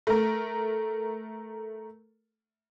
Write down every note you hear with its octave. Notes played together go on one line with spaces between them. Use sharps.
A3 A#4